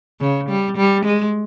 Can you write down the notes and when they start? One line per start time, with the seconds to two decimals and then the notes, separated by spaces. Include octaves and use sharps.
0.21 C#3
0.49 G3
0.77 G3
1.05 G#3